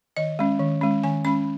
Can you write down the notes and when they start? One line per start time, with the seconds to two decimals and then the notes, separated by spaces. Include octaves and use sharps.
0.17 D#3 D#5
0.39 G#3 C#4
0.59 D#3
0.81 G#3 C#4
1.03 D#3 G#5
1.25 G#3 C#4 B5